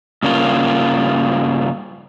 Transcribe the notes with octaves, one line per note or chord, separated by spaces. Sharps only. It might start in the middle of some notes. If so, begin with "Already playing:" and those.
G2 C#3 A#3 F4